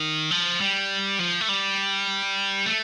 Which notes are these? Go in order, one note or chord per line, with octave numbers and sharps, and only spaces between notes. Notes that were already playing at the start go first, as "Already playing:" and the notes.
Already playing: D#3
F3
G3
F3
A3
G3
A3